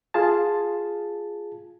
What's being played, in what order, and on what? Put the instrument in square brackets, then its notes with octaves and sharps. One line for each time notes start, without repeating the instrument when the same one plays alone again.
[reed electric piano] F4 G#4 A5